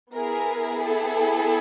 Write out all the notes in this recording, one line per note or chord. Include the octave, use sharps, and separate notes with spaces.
B3 E4 G#4 A#4
A4